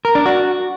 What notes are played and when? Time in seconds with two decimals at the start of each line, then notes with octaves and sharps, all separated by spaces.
0.05 A#4
0.15 D4
0.26 F#4